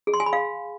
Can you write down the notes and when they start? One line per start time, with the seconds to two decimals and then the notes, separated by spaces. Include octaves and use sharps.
0.07 G#4
0.14 C6
0.20 G#5
0.26 B5
0.33 F5